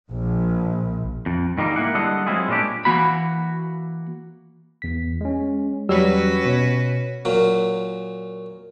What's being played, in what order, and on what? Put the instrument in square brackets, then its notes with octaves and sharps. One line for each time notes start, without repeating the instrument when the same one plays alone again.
[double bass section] A#1
[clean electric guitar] F2
G#2 D#3 G3 A#3 D#4
A#3 E4 F#5
D3 G3 G#3 A4 D#5 F#5
F#3 G#3 C4 E4 F4 G#4
A#2 G#3 C#4 D4 G4
E3 A#3 F#4 B5
[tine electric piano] E2 B6
G#3 C#4
[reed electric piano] E2 F#3 G3 [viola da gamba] C#4 F#4 B4 [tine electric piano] C#5 E6
[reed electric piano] B2 [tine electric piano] C#5
[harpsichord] A#2 F#3